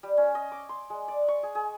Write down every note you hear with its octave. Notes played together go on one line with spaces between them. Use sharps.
G3
C#4
D#5
D6
C6
G#3
D5
C#6
G#4
G#4